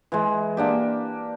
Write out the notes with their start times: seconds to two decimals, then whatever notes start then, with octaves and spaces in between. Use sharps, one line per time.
0.12 E3 G#3
0.57 A#3 D4 G4